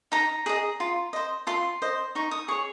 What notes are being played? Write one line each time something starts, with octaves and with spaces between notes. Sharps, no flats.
D#4 A#5
G#4 D#5
F4
C5 D#5
F4 C6
C5 D#5
D#4 C#6
D#6
G#4 C#5 C#6